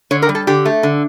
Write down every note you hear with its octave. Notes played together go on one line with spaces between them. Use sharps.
D3 C#5
A#4
G3
A4
D3 G4
A3
D3